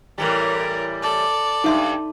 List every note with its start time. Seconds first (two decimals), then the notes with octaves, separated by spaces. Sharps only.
0.18 A2 E3 G3 A#4
1.02 A4 D5
1.64 G2 D#4 E5 C6